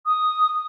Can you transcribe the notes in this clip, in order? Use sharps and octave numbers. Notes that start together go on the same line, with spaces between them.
D#6